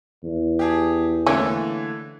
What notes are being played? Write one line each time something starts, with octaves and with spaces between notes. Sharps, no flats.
E2
G4 G#4 A5
D3 E3 A3 A#3 C#4